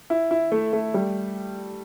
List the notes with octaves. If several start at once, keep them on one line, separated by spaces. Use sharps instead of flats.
E4
E4
A3
A3
G3